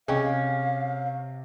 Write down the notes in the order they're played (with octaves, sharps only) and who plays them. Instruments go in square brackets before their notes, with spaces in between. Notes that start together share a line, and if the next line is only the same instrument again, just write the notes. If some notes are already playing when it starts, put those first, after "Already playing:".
[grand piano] C3 [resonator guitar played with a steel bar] C#4 [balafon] G#4 D#5 G5 [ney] F5